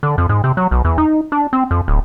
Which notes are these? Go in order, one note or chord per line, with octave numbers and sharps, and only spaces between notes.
D3
F2
G#2
C3
F#3
B1
E2
D#4
D4
C4
F2
D1